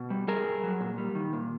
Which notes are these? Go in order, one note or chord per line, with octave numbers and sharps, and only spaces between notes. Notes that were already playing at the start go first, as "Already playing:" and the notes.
Already playing: B2
G3
G3 G#4 A#4
G2
F#3
A#2
G3
D#3
A#2